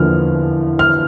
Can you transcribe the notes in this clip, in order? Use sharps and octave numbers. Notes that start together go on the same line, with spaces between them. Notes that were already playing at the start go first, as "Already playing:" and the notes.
Already playing: E2 D3 F3 A#3 E4 F6
F6